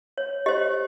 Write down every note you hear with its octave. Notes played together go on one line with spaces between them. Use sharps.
C#5
G4 C5 D#5